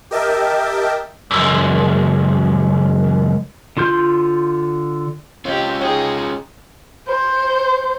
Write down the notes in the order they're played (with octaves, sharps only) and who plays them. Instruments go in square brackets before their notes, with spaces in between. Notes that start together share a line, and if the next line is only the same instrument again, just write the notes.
[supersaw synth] G4 A#4 D#5 E5 G5 A5
[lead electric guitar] C#2 F#2
[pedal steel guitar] D3 F4 C6 G6
[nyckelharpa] C4 G4 [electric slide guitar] C#4 F4 [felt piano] C#5 D#5
[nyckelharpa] D#4 G#4 [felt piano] C#5 G5
[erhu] C5